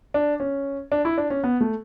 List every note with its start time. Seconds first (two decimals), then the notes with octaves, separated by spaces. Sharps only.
0.14 D4
0.40 C#4
0.92 D4
1.05 E4
1.18 D4
1.30 C#4
1.44 B3
1.61 A3